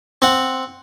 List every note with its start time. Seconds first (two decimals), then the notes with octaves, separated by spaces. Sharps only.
0.22 C4 F#5